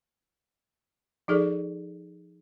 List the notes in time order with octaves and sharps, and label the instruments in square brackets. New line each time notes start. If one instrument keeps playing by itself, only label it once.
[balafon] F3 D#4 G#4 A4 D5